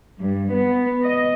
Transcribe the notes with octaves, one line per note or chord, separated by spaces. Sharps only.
G2
B3
D#5